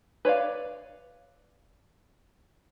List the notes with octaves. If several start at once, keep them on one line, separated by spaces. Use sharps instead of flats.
B4 C#5 D5 F5